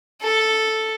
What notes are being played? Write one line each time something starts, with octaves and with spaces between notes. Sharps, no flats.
A4